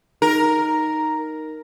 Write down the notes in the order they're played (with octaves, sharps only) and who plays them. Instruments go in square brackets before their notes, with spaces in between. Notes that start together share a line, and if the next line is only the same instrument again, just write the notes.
[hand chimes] D#4 [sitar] A#4